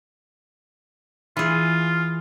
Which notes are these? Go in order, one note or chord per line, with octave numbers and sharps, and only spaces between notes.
E3 F4 G#4